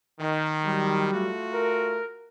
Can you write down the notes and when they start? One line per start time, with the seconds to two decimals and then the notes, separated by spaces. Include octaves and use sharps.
0.20 D#3
0.65 F#3 G3
1.13 A3 F4 F#4
1.53 A#4